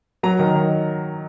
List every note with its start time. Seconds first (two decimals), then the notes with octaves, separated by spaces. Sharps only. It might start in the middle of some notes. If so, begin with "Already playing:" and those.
0.23 F#3 A#5
0.39 D#3
0.55 D#3